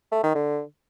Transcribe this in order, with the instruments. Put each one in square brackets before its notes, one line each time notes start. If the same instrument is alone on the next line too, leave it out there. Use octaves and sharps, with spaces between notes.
[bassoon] A3
D#3
D3